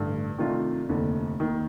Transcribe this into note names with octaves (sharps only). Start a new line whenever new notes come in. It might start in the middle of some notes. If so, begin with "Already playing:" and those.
Already playing: A1 G2 D3
C3 D#3 A3 D4 F4
F1 D#2 D3
D#2 D#3